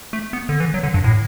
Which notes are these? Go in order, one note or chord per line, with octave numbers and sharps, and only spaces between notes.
A3
B3
D3
E3
F#3
D3
G2
A2